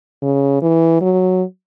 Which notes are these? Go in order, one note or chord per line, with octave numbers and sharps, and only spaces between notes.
C#3
E3
F#3